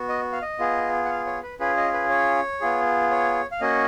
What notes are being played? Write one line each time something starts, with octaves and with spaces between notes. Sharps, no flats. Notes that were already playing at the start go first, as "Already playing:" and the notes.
Already playing: B3 F#4
D#5
F5
D#5
B3 F4 G#4
F#5
F5
C#5
B4
C#4 F4 G#4 B4
D#5
B4
C#5
B3 F4 G#4
C#5
F5
A#3 C#4 F#4 D#5